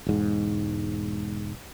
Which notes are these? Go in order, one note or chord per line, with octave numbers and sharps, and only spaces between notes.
E1 G#2